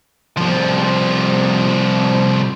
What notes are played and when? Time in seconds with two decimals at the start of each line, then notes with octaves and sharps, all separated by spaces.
0.37 C2 F3